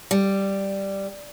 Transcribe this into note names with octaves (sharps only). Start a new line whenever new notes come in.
G3